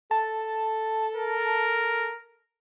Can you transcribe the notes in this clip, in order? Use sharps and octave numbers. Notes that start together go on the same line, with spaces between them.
A4 A5
A#4